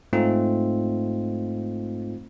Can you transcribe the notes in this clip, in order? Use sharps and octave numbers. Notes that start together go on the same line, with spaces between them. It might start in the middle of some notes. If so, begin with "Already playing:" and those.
G#2 A3 C4 D#4 F4